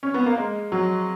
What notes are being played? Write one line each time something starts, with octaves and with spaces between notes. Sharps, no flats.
C#4
B3
A#3
G#3
F#3